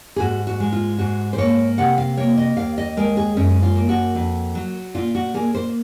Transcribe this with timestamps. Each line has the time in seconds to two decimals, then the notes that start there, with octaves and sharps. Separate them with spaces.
0.16 G#4
0.20 G#2 F#4
0.47 F#4
0.60 G#3
0.73 F4
0.99 G#2 F#4
1.33 C5
1.38 A#3 C#5
1.78 C3 F#5
1.98 F5
2.17 A#3 C#5
2.37 D#5
2.57 D#2 F5
2.78 D#5
2.97 G#3 A#4
3.17 G#4
3.37 F#2 C#4
3.62 F4
3.76 A#3
3.89 F#4
4.15 F2
4.55 F#3
4.94 A#2 F4
5.15 F#4
5.34 A#3 G#4
5.55 C5